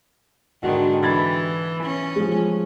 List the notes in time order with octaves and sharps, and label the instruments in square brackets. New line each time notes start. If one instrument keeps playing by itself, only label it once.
[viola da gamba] G#2 D3 D#3 [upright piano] F#4
[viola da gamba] E3 [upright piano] B5 G#6 A6
[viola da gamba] C#4
[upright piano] F3 G#3